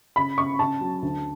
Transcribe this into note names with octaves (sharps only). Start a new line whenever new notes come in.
C#3 B5
C#3 C#6
C#3 A5
F#3
D2